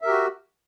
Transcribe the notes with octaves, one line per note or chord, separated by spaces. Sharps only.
F#4 G4 A#4 E5